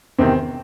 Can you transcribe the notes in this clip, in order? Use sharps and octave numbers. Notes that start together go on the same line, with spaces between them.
E2 C3 D#3 C4